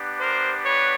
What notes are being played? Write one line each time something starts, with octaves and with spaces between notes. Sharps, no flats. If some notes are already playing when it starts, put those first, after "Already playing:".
Already playing: B3 D4 G4
A#4 C5
B4 C#5